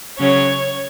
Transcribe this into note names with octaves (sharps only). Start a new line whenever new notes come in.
C#3 F#3 C#4 C#5